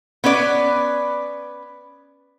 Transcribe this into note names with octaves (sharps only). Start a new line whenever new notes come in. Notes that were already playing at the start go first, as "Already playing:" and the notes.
B3 C#4 B4 D5